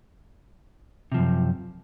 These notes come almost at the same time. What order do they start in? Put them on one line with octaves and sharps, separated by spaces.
C3 F3 F#2